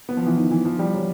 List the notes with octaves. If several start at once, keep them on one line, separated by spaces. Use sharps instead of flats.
B3
F3
E3
D#3
E3
F3
G3
F#3